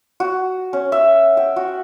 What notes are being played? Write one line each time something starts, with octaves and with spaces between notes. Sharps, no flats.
F#4
C#4
E5
G5
F#4